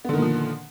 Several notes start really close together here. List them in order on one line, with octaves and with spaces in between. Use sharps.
B3 D3 D#3 A#2 F3